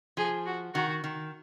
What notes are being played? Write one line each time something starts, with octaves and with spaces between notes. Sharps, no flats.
F3 G#4
F#4
D#3 F#4
D#3